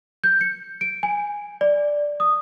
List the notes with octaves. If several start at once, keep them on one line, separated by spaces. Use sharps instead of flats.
G6
C#7
D7
G#5
D5
D#6